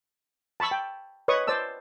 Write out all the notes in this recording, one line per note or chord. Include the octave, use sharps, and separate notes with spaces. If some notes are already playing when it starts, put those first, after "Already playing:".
A5 B5 C#6 E6
G5
B4 C#5 D#5 C#6 D#6
C5 D5 A5 E6